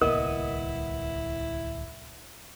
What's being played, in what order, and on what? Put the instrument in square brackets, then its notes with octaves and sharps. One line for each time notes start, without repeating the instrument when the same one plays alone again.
[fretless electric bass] D1 C2 A#3 [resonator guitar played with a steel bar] B3 D#5 [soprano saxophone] E4 [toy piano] A#4